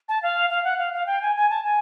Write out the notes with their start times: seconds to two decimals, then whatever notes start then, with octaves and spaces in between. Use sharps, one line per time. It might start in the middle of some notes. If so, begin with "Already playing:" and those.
0.09 A5
0.23 F5
0.50 F5
0.64 F#5
0.78 F5
0.93 F5
1.07 G5
1.22 G#5
1.36 G#5
1.50 A5
1.64 G#5